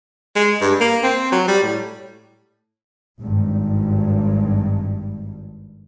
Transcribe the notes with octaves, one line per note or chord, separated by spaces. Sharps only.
G#3
G2
A#3
C4
F#3
G3
A2
G#1 G2